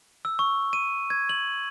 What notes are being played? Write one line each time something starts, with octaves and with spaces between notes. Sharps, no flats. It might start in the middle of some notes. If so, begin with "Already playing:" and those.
E6
C#6
D#7
G#6
F#7